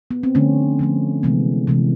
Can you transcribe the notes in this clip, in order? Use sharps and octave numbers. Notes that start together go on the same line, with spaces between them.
B3
C4
D3 F3 A3 C#4
D3 F3 A3
C3 E3 G#3 B3
C3 E3 G#3